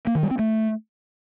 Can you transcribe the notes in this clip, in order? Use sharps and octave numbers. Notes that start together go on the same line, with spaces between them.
A#3
D#3
G3
C4
A3